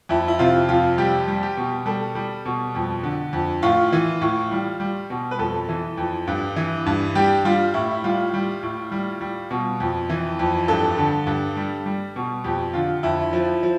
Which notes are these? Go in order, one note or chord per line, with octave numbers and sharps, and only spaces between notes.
F2 E4
E4
C3 F4
F2 F4
G3 G4
G3
G4
B2
G3 A4
G3
B2
F2
D3
F2
A2 F4
E3
A2
G3
G3
B2
B4
F2 A4
E3
F2
G2
E3
G2
G3 G4
G3 F4
A2 E4
G3 F4
G3
A2
G3
G3
B2
F2
E3
F2
G2 A4
D3
G2
G3
G3
B2
F2 G4
D3 F4
F2 E4
F3
F3